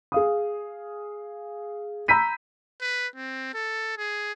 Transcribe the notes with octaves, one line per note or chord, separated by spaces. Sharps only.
G#4 F5 D#6
A#5 B5 E6 G6 B6 D#7
B4
C4
A4
G#4